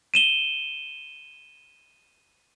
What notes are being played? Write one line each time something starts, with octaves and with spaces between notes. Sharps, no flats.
D#7 E7 G7